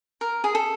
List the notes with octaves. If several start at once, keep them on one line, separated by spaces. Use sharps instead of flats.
A#4
G#4
A4